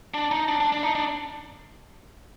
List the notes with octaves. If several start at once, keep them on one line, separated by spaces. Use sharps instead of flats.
D4
D#4
D4
D4
D4
D#4
D4